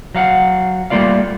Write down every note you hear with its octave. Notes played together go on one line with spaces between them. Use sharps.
F#3 F5 F#5
G3 A3 A#3 F4 D5 F5